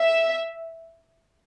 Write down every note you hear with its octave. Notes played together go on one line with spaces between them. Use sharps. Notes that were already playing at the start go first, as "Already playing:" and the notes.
Already playing: E5